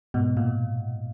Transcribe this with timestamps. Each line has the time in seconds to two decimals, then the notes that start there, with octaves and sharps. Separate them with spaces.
0.14 G#2 B2
0.37 A#2